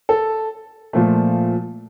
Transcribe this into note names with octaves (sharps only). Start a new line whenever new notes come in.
A4
A#2 F3 A3